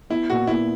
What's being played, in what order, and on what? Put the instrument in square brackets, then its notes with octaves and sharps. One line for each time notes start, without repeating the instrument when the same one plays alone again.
[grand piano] B3 [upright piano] E4
[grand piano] A#2 [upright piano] F#4
[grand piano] B3 [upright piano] E4